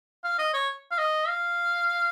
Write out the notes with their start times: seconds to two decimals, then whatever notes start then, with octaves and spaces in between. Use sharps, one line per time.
0.24 F5
0.39 D#5
0.54 C#5
0.91 F5
0.98 D#5
1.28 F5